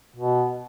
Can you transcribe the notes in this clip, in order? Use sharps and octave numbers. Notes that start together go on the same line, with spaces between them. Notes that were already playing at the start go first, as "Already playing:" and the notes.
B2